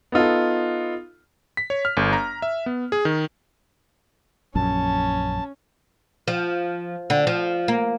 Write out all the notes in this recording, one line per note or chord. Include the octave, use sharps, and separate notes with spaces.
B3 D#4 F4 A4
B6
C#5
F6
G1
A#5
E5
B3
G#4
D#3
A#1 F#2 C#4 A5
F3
D3
F3
A#3